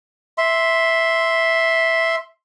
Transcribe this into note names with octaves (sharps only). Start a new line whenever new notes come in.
E5 C6